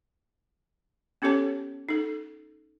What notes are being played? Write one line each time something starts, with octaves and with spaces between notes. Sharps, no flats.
B3 C#4 G4 A4 C#5 A5
D#4 A4